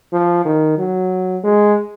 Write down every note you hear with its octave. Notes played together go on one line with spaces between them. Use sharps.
F3
D#3
F#3
G#3